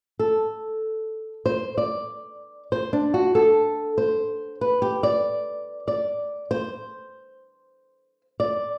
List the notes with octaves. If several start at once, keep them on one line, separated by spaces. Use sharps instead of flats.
A4
C5
D5
C5
D4
F#4
A4
C5
B4
G4
D5
D5
C5
D5